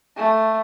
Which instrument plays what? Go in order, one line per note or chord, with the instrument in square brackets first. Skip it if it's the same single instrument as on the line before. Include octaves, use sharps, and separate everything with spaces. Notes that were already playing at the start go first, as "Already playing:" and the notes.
[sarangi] A3